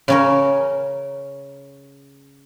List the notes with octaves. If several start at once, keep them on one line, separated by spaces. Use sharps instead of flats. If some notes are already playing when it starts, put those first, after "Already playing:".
C#3 C#4 A#4